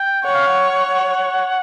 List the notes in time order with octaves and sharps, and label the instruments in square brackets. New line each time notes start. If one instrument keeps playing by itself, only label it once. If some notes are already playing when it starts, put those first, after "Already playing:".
Already playing: [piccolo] G5
[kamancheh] C#5 [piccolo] F#5
[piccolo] F5
F#5